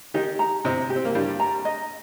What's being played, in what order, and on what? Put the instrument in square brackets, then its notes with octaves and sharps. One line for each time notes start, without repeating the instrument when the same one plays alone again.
[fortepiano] D#3 D#4 [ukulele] G4
[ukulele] A#5
[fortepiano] C3 C4 [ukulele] D#5
[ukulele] G4
[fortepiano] C4
A#3
[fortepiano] G2 G3 [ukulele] G4
[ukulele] A#5
D#5